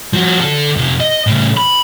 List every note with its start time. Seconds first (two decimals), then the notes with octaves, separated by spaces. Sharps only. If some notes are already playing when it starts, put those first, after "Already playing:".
0.13 F3 F#4
0.40 D3 A4
0.76 F2 C3
1.00 D#5
1.27 A2 C#3
1.57 B5